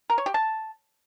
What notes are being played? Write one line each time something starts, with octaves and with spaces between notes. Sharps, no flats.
A#4
C#5
G4
A5